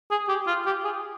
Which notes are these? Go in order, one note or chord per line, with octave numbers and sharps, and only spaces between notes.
G#4
G4
F4
G4
G#4